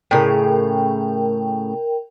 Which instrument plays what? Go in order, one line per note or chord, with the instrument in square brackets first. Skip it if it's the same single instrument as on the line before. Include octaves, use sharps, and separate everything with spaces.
[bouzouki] A2 C#3 [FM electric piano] A#4 G5